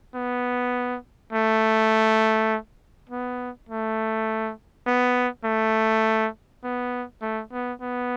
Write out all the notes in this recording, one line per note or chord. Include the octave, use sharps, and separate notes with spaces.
B3
A3
B3
A3
B3
A3
B3
A3
B3
B3